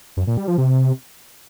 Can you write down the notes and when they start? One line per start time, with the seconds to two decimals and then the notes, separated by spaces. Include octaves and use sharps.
0.17 F#2
0.27 A#2
0.37 G3
0.48 F3
0.58 C3